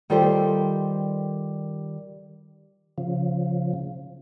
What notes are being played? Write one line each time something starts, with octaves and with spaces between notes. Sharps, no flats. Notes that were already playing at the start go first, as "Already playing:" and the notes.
D#3 G3 F4 G4 A4 C5
C#3 F3